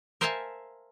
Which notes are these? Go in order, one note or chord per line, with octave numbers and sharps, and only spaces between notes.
A#4 C5 E5 F5 G#5 A5